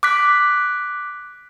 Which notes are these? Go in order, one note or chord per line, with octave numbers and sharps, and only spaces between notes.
D6 F#6 B6